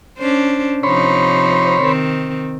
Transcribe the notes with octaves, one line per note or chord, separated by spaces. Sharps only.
C#4 D4 C5
C3 F3 D#4 C5 C#5 B5
D#3 C4